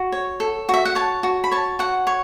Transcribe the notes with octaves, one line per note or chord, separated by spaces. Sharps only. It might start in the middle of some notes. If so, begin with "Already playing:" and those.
Already playing: F#4
C#5
A4
F#4 E5
F#5
C#5 A5
F#4
B5
C#5 A5
F#4 F#5
C#5